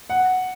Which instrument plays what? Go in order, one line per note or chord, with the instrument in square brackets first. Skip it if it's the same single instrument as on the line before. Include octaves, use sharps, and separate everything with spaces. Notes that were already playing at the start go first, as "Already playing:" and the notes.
[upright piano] F#5